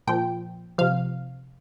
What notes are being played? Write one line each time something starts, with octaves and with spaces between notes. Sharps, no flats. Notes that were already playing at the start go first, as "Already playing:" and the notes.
A#2 F3 G5
C3 F3 F5